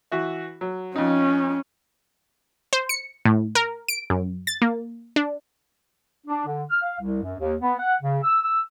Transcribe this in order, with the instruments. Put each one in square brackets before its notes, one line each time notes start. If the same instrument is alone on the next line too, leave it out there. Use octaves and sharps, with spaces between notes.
[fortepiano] E3 F#4 E5
F#3
[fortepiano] F2 D#4 [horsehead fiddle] C#4
[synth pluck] C5
C#7
A2
A#4
D7
F#2
A6
A#3
D4
[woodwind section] D4
D3
F6
F5
C2
F#2
D#2
B3
F#5
C#3
E6
E6